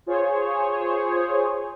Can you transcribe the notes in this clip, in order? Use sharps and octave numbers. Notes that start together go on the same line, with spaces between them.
F4 G#4 C5 C#5